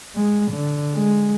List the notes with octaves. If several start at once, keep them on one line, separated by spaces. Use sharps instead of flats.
G#3
D3
G#3